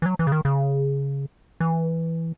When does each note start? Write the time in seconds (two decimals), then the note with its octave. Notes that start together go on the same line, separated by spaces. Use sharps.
0.02 E3
0.06 F#3
0.19 E3
0.27 C#3
0.32 D#3
0.45 C#3
1.60 E3